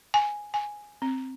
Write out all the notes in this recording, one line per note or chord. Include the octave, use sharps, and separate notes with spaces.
G#5
G#5
C4